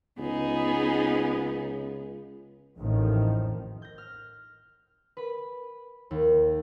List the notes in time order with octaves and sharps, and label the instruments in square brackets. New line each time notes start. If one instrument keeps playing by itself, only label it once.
[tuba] C#2 [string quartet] B3 D#4 G#4
[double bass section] A1 F2 A2 D#3 F3
[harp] G6 A#6
F6
B4 B5
D#2